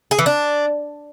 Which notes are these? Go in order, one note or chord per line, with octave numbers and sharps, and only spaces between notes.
G#4
E3
D4